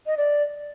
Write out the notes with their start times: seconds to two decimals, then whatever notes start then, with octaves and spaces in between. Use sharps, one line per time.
0.07 D#5
0.17 D5